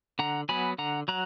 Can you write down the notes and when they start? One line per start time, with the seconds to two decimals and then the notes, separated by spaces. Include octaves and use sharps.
0.19 D3 F#5 A#5
0.49 F#3 B3 G#5 B5
0.78 D3 F#5 A#5
1.08 F#3 F#5 A#5